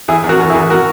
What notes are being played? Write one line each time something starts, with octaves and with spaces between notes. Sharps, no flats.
E2 E4 G#4
E2
F#4 A#4
E2
E4 G#4
E2
F#4 A#4